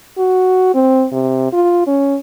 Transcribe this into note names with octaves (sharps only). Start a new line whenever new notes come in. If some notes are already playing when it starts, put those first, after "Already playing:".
F#4
C4
C3
F4
C#4